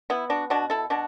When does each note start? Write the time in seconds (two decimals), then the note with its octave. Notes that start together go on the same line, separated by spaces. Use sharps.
0.10 B3 E4
0.30 D4 F#4
0.50 B2 D4 F#4
0.70 E4 A4
0.90 B2 D4 F#4